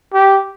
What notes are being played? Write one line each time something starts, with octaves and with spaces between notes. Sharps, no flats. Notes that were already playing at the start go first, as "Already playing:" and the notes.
G4